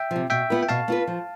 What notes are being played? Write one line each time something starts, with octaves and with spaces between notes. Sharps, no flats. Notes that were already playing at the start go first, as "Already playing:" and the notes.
Already playing: E5 G5
C3 F3
B2 E5 G5
B3 F4 B4
G5
B2 F5 A5
B3 F4 B4
F3